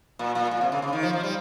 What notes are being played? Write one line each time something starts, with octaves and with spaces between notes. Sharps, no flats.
A#2
A#2
A#2
C3
C#3
C#3
D#3
F3
F3
G3